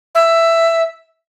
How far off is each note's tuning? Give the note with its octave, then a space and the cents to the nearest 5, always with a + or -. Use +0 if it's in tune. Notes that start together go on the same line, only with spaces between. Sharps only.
E5 +10